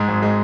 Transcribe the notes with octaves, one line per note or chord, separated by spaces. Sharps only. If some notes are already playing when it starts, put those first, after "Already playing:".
Already playing: G#2 G#3
G#1
G#3